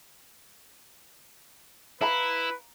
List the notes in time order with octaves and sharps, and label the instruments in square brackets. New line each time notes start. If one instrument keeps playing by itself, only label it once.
[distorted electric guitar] E4 [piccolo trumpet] B4 [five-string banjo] F5 A#5 B5